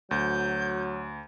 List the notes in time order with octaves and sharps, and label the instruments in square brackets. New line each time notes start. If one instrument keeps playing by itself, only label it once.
[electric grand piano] D2 [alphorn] F#3 [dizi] G6